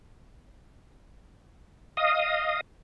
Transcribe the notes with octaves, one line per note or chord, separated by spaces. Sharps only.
D#5 F5 D#6